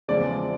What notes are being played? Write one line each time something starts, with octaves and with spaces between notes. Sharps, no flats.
E2 C#3 F3 G#3 C4 D5